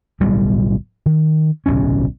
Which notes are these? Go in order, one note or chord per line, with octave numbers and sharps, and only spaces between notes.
D1 B1 A#2 G3
D#3
D1 B1 C3 C#4